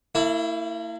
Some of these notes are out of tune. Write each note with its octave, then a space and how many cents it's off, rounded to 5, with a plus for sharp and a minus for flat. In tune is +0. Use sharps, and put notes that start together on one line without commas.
A#3 -45 E4 +0